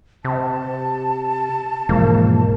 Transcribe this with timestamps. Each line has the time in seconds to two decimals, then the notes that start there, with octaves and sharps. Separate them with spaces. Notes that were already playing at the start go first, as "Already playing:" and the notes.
0.25 C3 A5
1.89 E1 G#2 F3 G#3 A#3